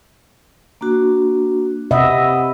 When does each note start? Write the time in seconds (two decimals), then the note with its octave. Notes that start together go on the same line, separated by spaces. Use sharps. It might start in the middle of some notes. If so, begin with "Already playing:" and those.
0.81 A#3 D4 F#4
1.91 C3 D#5 E5 F#5 B5 D#6